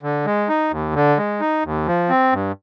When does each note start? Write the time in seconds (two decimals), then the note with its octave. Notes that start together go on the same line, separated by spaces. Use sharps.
0.03 D3
0.25 G#3
0.49 D#4
0.71 D#2
0.95 D3
1.18 G#3
1.41 D#4
1.64 D#2
1.87 F3
2.09 C4
2.33 G2